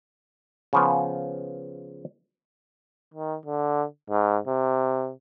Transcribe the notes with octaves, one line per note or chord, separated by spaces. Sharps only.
C#3 F3 B3
D#3
D3
G#2
C3